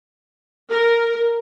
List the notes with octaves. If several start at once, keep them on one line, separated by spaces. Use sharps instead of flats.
A#4